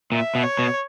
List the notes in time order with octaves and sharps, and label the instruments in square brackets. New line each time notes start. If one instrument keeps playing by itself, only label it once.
[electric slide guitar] A#2 [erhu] E5
[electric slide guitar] B2
[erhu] C#5
[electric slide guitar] B2